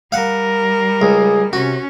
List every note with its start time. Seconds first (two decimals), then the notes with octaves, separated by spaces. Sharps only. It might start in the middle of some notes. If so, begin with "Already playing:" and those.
0.12 G3 A#4 F5 F#5
1.02 C#2 G#4
1.53 C3 C#4 F#4